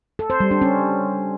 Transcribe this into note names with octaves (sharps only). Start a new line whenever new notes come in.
A4
C5
G3
D4
C#4